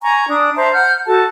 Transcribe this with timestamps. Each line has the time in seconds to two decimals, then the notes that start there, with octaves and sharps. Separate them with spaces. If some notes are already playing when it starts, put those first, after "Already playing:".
0.03 G#5 A#5 C#6
0.29 D4 D#6
0.56 C5 E5 A5 A#5
0.73 F#5 F6 G6
1.06 F#4 A4 A5